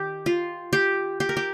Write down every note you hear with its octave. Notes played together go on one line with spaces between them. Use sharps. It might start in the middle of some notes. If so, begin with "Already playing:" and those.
Already playing: D#3 G4
F4
G4
G4
A#4
G4